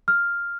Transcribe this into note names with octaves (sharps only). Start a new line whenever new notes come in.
F6